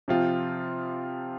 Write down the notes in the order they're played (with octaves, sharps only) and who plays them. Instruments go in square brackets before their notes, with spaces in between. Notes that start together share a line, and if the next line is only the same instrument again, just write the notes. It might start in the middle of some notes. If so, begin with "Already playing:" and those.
[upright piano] C3 F3 C4 F4